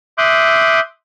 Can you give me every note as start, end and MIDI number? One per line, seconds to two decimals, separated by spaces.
0.18 0.80 76
0.18 0.80 84
0.18 0.80 86
0.18 0.80 87
0.18 0.80 90
0.18 0.80 91